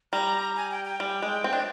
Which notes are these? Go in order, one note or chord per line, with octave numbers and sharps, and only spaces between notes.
G3 A#5
G#5
G5
G5
G3
G#3
C4
D4